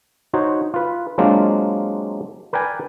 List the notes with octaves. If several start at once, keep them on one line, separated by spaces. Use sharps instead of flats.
D#4 F#4 C5 C#5
F4 B4
F#3 G#3 A#3 C4 D4 F4
A#4 B4 D5 G5 G#5